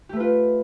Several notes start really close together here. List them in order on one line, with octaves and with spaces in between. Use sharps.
G4 A3 B4 F4